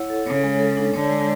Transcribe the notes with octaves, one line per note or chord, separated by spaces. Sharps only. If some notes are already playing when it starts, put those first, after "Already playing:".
Already playing: E4 C#5 F#5
A4
C#3 C#5
G#3
A4
D4
D3 C#5
G#3